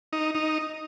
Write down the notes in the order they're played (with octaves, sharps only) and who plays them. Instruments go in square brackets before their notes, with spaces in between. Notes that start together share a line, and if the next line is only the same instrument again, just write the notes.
[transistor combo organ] D#4
D#4